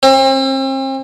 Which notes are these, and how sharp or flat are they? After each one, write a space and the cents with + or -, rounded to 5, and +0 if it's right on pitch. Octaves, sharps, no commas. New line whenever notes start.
C4 +40